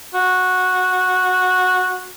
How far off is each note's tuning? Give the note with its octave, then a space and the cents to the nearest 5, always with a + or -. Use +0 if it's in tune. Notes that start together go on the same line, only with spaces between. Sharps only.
F#4 -10